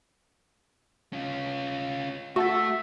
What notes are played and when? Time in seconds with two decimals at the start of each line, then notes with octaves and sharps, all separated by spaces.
1.13 C#4 F4
2.36 A3 F#4 E5 F#5 A5 A6